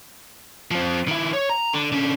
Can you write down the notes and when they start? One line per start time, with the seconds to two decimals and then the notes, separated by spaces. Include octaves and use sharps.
0.71 F3 C4
1.08 D#3 E4
1.33 C#5
1.50 A#5
1.73 D3
1.92 D3 C#4